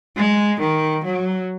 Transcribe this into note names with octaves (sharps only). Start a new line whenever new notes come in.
G#3
D#3
F#3